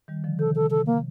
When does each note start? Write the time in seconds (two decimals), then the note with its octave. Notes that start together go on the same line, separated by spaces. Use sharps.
0.08 D#3 G3
0.24 D3 F3
0.39 C3 D#3 A4
0.55 A4
0.70 C3 A4
0.86 A#3